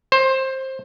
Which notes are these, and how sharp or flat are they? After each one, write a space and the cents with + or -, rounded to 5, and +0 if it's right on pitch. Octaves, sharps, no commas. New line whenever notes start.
C5 +15